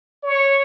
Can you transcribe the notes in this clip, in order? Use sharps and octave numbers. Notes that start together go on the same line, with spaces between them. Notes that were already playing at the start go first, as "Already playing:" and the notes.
C#5